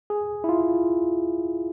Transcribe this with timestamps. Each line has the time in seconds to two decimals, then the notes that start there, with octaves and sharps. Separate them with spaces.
0.10 G#4
0.44 E4
0.49 F4